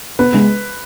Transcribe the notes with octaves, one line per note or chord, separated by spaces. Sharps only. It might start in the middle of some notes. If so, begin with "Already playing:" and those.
B3 B4
G#3